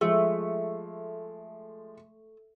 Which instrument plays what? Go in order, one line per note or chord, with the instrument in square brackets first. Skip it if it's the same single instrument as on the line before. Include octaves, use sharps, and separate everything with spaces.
[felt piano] F3 G#3 [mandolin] A3